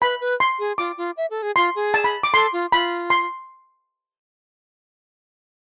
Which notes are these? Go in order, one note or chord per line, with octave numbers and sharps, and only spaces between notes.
B4 B5
B4
C6
G#4
F4 D6
F4
E5
A4
G#4
F4 C6
G#4
A5
B5
D6
A4 C6
F4
F4 B5
C6